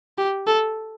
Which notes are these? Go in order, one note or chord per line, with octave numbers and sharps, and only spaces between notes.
G4
A4